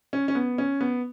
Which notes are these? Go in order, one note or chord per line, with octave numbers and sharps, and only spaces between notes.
C#4
C#4
B3
C#4
B3